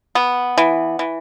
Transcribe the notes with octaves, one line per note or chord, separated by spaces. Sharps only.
B3
E3
E3